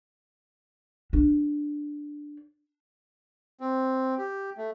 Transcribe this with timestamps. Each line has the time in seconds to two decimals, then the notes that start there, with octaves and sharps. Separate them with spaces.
1.13 D4
3.60 C4
4.18 G4
4.57 A3